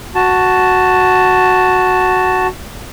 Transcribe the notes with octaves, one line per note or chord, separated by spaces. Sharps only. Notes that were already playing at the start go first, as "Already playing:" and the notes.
F#4 A5